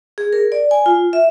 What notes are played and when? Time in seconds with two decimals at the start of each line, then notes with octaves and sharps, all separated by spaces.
0.18 G#4
0.33 A#4
0.52 D5
0.71 G#5
0.86 F4
1.13 E5